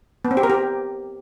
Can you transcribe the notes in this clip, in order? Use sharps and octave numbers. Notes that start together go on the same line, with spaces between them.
B3
C4
G4
A#4
G4